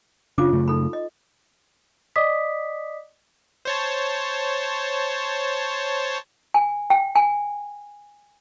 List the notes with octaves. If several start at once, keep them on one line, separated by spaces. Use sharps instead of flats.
F#1 C#3 D4 F4 F5 D6
F#2 C#3 A3
D#4 A4 B5
D#5
D5 D#5 D6 D#6 B6
C5 C#5 A5
G#5
G5
G#5